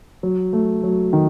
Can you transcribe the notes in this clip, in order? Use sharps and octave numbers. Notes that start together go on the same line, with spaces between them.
F#3
A3
F#3
D#3